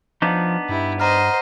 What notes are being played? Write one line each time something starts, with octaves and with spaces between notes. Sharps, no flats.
F3 B3 D4 D#4
G2 E4
C5 D#5 F#5 A#5 F6